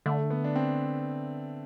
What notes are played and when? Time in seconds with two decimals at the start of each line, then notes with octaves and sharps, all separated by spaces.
0.06 D3 A3
0.30 B3
0.44 D4
0.55 C4